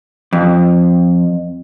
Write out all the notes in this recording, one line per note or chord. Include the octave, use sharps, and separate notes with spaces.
F2